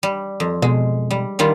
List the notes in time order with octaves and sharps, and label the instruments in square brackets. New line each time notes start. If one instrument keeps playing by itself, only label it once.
[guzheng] G3
F2
[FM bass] B2 [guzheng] G#3
[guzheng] G3
D#3 G3 F4